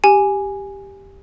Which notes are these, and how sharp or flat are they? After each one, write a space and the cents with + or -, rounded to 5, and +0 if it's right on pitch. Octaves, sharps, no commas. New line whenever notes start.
G4 +0 G#5 +0